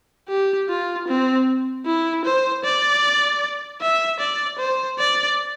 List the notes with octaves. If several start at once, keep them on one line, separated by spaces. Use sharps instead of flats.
G4
F4
C4
E4
C5
D5
E5
D5
C5
D5